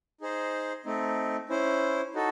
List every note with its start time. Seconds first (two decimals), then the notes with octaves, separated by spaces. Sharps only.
0.21 D#4 G#4 C5
0.85 A3 C4 D#4
1.49 C#4 E4 C5
2.14 D#4 F#4 A4